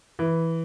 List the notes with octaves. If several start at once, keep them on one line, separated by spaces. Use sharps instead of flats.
E3